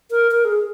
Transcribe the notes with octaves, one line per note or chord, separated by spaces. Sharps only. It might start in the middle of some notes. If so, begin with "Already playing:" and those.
A#4
A#4
G#4